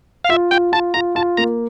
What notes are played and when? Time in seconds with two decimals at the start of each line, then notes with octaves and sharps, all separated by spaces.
0.24 F5
0.29 F4 E5
0.51 F4 G5
0.72 F4 A5
0.94 F4 A#5
1.15 F4 A5
1.37 A#3 A#5